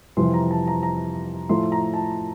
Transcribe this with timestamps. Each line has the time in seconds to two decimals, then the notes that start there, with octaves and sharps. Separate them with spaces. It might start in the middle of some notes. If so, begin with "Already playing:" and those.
0.17 F2 C3 E3 G3 C6
0.34 A#5
0.51 A5
0.67 A#5
0.83 A#5
1.49 A2 F3 A3 C6
1.72 A#5
1.94 A5